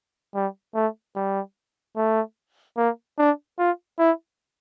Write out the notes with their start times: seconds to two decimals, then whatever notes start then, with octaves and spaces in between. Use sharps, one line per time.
0.35 G3
0.75 A3
1.16 G3
1.96 A3
2.77 A#3
3.18 D4
3.59 F4
3.99 E4